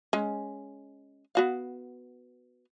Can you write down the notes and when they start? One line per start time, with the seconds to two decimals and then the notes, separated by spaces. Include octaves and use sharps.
0.13 G#3 C#4
1.35 B3 F#4 F5